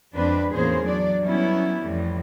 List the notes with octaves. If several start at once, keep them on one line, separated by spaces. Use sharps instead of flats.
F2 G#3 C4 D4 B4
E2 A2 A#3 C#4 G#4 C5
F#3 D4 D5
F#3 G3 B3 C#4 E4
F2 A2 E3 G3